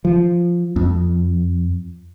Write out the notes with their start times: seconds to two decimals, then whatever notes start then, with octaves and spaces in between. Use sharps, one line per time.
0.05 F3
0.76 F2